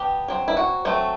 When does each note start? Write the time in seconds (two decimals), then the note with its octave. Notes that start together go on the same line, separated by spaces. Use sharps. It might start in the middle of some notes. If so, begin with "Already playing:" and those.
Already playing: B3 D4 G4
0.28 F#3 C4
0.48 E4
0.57 F#4
0.85 F#3 A3 C4